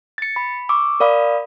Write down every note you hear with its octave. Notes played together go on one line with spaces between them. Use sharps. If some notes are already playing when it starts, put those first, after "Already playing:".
A6 C#7
B5
C#6 D6 E6
A#4 D5 F5 B5 D#6